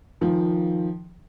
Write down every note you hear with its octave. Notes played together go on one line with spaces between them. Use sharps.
D#3 F3